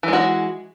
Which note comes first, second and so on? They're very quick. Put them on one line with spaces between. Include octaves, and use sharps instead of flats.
E3 G#3 F#4